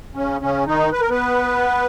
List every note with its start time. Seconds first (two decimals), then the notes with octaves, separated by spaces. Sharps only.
0.15 C#3 C#4
0.41 C#3 C#4
0.66 D#3 D#4
0.92 B4
1.01 A#4
1.10 B3 B4